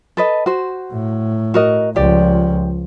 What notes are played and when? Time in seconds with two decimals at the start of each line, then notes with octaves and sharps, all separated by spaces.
0.17 A4 B4 D#5
0.46 F#4 C5
0.92 A2
1.54 F#4 A#4 D#5
1.96 C#2 F3 G4 D5